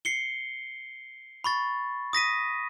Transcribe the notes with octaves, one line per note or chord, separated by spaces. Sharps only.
C7 C#7 G7
B5 C#6 A6
D#6 A#6 B6 D#7